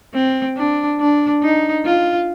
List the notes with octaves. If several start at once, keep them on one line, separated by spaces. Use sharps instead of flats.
C4
D4
D4
D#4
F4